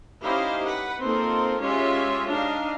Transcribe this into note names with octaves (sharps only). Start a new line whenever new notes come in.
C#4 D#4 E4 G4 C5 F5
B4 F#5
A#3 C4 D#4 F4 A4 A#4
G#3 C#4 F4 G4 C#5 E5
D4 D#4 F5